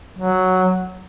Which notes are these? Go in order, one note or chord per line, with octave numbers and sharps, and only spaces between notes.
F#3